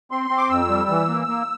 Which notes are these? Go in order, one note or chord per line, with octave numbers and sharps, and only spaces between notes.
C4 C6
C4
D6
F2 E6
G3
E3
A#3
A#3